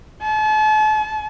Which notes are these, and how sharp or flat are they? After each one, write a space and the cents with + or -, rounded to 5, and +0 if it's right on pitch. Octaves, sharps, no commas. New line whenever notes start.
A5 -40